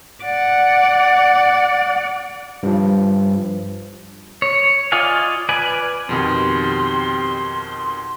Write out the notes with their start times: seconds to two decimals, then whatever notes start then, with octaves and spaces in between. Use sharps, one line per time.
0.23 D5 F#5
2.63 G2 F3
4.42 C#5
4.92 F4 D5 D#5 F5 G#5
5.49 B4 D5 G#5
6.09 F2 B2 D#3 C4 G4 C6